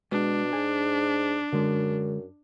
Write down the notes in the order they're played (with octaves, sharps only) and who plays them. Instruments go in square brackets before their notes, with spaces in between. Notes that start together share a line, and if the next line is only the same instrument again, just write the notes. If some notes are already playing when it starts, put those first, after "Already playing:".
[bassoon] B2 [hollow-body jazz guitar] G#3 [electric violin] D4
[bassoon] G#2 [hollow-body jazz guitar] G#5
[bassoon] F#2 [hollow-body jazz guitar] D3 G#3